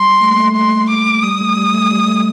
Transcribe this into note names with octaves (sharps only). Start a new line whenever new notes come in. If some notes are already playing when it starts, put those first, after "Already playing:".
Already playing: G3 C6
A3
A#3
A3
A3 C6
D6
G3 D#6
A3
G3
A3
G3
A3